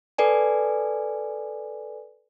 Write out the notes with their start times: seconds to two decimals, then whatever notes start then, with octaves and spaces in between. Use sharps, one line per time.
0.18 A4 B4 D5 G#5